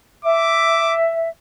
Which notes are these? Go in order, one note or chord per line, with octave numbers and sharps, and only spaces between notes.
E5 D6